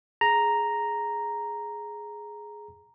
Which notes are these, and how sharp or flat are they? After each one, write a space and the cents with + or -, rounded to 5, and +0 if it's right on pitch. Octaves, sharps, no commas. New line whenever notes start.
G#4 +10 A#5 +0